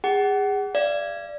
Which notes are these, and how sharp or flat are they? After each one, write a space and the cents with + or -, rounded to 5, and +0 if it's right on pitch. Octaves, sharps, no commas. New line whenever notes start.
G#4 -30 F#5 +30
D5 +0 F5 -40